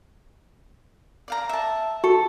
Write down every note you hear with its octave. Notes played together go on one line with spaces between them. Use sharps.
D5 F5 A#5
E5 A5
F#4 A4